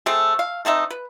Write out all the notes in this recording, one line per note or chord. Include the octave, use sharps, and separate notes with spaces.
A3 C4 G#4 A4
F5
A3 C4 D#4 E5
B4